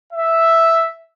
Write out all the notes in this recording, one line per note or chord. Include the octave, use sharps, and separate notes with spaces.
E5